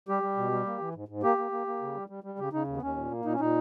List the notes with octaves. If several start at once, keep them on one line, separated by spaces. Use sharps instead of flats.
G3 G4
G3
B2
G3
A#3
E3
G#2
G#2
A#3 G4
A#3
A#3
A#3
C#3
G3
G3
G3
C#3 G4
C#3 D#4
D#2
B3
D#2 C#4
A#2
A#3
A#2 D#4
C#4
A#2 D#4